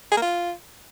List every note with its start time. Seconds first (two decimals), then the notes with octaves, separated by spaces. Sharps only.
0.12 G#4
0.17 A#3
0.22 F4